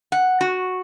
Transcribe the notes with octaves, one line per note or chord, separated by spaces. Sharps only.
F#5
F#4